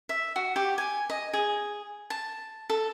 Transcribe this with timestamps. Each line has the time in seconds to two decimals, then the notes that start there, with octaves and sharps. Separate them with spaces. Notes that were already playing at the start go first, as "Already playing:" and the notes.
0.09 E5
0.36 F#4
0.56 G4
0.78 G#5
1.10 D#5
1.33 G#4
2.10 A5
2.70 A4